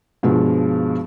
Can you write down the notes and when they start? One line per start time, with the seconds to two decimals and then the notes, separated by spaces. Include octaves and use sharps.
0.23 G2 B2 F3 G#3